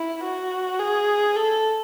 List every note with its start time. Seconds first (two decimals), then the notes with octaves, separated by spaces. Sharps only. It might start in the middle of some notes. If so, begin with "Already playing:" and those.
Already playing: E4
0.24 F#4
0.79 G#4
1.36 A4